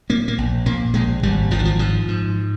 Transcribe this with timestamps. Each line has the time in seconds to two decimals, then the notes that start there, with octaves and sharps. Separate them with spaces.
0.09 A#2 A#3
0.28 A#3
0.38 A#1
0.66 A#2 A#3
0.94 A#1 G#3
1.23 G#1 G3
1.51 G#1 F3
1.59 D#3
1.65 F3
1.79 G#2 F3
2.08 G#2